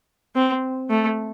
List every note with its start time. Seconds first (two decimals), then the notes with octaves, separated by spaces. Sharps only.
0.35 C4
0.90 A3